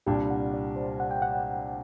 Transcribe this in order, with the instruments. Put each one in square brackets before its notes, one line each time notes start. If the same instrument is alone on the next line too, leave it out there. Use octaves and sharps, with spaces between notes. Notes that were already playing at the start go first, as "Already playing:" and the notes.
[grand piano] C2 A#2 G3 D4 [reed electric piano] G5
[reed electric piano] F#5
D5
C5
F#5
G5
F#5